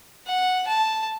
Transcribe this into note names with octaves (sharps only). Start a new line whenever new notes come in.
F#5
A5